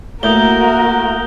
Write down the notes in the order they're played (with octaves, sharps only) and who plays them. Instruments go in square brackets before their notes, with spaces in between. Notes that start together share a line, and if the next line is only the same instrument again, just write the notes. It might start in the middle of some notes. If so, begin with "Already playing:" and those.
[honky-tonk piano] A3 E4 [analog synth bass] A#3 [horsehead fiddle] F#4 A#4 [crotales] D#6 G6 G7